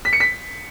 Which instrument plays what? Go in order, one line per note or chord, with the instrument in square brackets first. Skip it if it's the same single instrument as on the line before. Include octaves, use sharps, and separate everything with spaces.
[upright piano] B6
C#7
B6